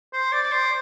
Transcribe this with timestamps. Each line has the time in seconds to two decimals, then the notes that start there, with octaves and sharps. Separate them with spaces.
0.13 C5
0.32 D5
0.43 D5
0.52 C5